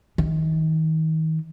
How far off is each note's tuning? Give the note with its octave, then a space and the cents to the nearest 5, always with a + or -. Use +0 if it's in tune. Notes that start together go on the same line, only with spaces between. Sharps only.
D#3 +35 D#4 -20